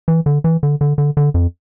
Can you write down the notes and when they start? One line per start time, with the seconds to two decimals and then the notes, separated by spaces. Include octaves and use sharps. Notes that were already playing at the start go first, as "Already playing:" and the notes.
0.08 E3
0.26 D3
0.44 E3
0.63 D3
0.81 D3
0.98 D3
1.17 D3
1.34 F2